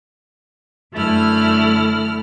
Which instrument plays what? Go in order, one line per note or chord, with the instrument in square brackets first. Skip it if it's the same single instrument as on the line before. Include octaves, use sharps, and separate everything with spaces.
[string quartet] F#2 D3 A3 E4 F6